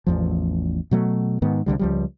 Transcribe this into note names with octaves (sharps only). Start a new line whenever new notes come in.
A1 E2 F3
B2 F#3 A3
G#2 D#3 B3
C2 F2 D3 G3
C#2 F3 G3